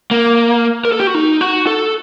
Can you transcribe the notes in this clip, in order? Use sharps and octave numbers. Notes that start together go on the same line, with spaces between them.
A#3
A#4
A4
G4
F#4
D#4
F#4
A4